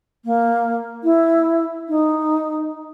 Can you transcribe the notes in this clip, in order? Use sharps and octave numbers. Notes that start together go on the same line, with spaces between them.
A#3
E4
D#4